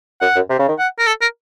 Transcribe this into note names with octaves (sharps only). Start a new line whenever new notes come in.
F#2 F#5
F#2
C3
C#3
D#3
F#5
A#4
A4
A#4